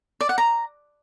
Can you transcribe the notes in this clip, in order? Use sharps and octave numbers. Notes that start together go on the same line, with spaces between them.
D5
F#5
A#5